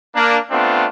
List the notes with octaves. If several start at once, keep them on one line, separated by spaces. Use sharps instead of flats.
A#3 D4
A3 B3 C4 D4 F4